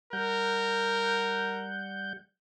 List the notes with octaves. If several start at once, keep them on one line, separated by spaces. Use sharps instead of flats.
G3 A#4 F#5 G6